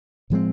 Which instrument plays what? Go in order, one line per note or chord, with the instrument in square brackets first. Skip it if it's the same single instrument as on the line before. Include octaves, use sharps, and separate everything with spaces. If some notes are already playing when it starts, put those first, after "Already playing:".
[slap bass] A2 F3 G#3 C4